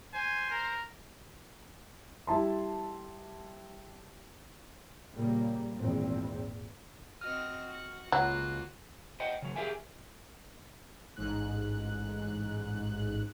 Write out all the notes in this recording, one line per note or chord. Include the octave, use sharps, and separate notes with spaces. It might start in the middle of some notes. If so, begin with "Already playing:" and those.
C5 G#5
A#4
G3 E4 A5 C6
A#2 C#3 G3 A#3
G#1 E2 A#2 E3 C4
C4 F#4 D#5 F6
F#4
C#2 F#3 A#3 F4 F#4 F#6
C5 D#5 F#5 G5
C#3 F#3
G4 G#4 A#4 E5 F5 G#5
A1 G#2 F#6